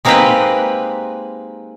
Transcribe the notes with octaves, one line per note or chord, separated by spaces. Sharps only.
G#3 A#3 C4 D#4 G4 B4